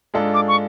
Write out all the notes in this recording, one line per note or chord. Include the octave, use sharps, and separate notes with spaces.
G#2 G#3 D4 F4 A4
D6
C#6